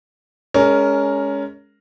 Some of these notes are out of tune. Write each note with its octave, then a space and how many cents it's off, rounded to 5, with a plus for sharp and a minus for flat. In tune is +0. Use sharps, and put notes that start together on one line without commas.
G#3 +5 C#4 +20 A#4 -5